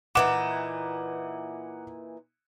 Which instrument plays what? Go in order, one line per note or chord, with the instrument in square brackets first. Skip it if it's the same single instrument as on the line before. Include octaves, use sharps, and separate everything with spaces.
[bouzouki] A#2 E3 D#4 [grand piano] F#5 D6 E7